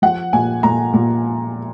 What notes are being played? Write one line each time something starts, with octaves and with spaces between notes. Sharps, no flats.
F3 F#5
A#2 G#5
A#2 A#5
A#2